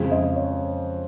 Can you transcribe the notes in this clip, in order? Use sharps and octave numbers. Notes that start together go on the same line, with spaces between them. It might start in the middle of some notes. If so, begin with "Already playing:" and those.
Already playing: F2 C#3 G#3
D#5
C#5